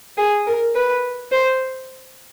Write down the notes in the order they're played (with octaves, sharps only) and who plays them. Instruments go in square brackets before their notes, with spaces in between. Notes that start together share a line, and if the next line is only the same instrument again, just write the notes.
[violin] G#4
A#4
B4
C5